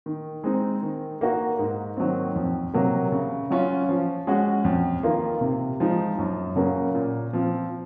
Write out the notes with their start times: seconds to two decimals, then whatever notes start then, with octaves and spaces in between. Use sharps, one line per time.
0.06 D#3
0.44 G#3 C4 D#4
0.83 D#3
1.21 A#3 D#4 F#4
1.59 G#2
1.97 D#3 F#3 C4
2.36 F2
2.74 C3 F#3 A#3
3.12 C#3
3.50 F#3 C#4 F4
3.89 F3
4.27 G#3 C#4 F#4
4.65 F2
5.03 D#3 A#3 F4
5.41 C3
5.80 F3 G#3 D#4
6.18 F#2
6.56 C#3 F#3 A#3 C#4
6.95 A#2
7.33 F3 C4